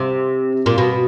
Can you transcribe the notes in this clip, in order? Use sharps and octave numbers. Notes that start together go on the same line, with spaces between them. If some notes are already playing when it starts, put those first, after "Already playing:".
Already playing: C3
A#2
B2